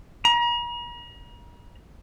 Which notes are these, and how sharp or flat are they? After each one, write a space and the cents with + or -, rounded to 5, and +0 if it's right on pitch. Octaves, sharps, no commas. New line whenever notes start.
A#5 +40